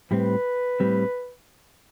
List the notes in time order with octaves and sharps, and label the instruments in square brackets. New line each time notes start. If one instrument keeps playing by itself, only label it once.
[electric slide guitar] A2 G3 C4 [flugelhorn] B4
[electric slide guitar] A2 G3 C4